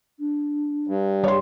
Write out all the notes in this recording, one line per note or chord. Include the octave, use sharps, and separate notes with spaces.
D4
G2
G3 C#5 C6